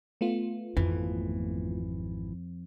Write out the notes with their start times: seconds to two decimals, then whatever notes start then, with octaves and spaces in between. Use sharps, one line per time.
0.21 A3 B3 F4
0.77 G#1 F2 E3